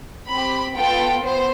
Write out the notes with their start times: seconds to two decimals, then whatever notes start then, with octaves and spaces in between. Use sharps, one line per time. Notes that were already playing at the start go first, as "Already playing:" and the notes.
0.28 C4 G4 B5
0.76 B3 F4 A4 G5
1.23 B3 C5